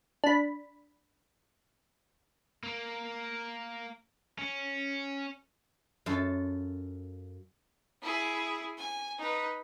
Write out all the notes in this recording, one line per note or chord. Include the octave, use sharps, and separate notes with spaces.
D4 B5
A#3
C#4
F#2 F4 A4
E4 G#4
G#5
D#4 B4